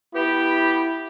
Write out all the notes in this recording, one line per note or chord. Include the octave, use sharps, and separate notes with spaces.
B3 E4 G4